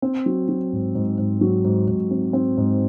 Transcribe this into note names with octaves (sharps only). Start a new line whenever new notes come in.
C4
F#3
F#3
G#2
G#2
G#2
F#3
G#2
G#2
C4
C4
G#2